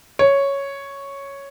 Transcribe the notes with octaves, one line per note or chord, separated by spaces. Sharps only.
C#5